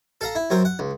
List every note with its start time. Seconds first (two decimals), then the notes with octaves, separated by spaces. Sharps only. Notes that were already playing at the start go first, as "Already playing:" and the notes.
0.21 A4 F5 A#5
0.35 E4
0.50 F#2 C4 A#4
0.65 F#5
0.79 C#2